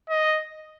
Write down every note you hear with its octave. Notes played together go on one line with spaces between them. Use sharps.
D#5